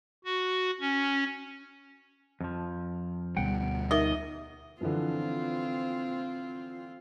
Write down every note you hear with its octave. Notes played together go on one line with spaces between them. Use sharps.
F#4
C#4
F2 F3
D2 B2 G3 F#5 G5
D#4 A#4 D#5 E5
D3 E3 F3 C4 F4